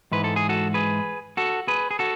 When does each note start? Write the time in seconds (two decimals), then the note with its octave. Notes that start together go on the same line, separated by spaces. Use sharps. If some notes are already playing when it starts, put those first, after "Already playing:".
0.12 G#2 E3 G#3 B4
0.24 A4
0.36 G#4
0.49 F#4 A4
0.74 G#4 B4
1.37 F#4 A4
1.68 G#4 B4
1.91 G#4
1.99 F#4 A4